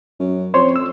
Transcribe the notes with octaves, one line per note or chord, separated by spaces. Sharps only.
F#2
F2 C5 C#5 C6
E6